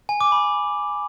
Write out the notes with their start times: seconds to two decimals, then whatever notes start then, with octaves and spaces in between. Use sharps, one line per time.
0.09 G#5
0.21 D6
0.32 B5